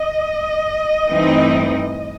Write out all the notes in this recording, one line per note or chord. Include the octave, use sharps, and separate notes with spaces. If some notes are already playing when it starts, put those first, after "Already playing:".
Already playing: D#5
G2 E3 A3 C4 D#4